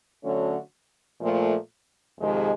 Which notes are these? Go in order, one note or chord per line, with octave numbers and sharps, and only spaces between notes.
D3 F#3 A3 C#4 F#4
A#2 F3 A3
F2 C3 D#3 G#3